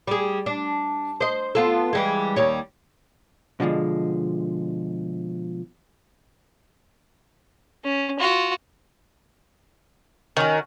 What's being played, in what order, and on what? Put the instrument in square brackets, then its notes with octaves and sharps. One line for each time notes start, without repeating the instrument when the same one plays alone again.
[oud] G3 G#4
D4
C5 D#5
B3 F4 A4
E3 G3 G#3
D#2 G3 C#5
[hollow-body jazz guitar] B2 D3 F3 G#3
[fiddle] C#4
F4 F#4
[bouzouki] D#3 F#4 [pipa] C#4